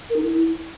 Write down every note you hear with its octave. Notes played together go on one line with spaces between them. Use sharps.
A#4
D#4
E4